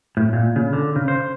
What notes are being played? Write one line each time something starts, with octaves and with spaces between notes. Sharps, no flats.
A2
A#2
C#3
D3
C#3
C5